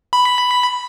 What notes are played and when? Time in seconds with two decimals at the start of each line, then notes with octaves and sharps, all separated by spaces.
0.13 B5